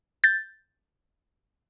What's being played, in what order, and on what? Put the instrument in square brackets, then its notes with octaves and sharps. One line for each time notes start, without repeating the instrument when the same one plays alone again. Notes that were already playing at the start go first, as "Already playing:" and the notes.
[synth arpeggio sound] G6 A6